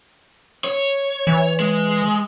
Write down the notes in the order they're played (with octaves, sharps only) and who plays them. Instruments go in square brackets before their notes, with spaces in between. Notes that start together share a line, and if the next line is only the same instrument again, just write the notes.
[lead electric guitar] C#5
[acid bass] E3
[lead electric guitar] G#3